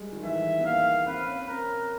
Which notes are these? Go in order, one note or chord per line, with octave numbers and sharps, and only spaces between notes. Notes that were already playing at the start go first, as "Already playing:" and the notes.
Already playing: G3 G#3
D#3
E3 E5
B3
A#3 F5
C4 B4
C#4
C4 A#4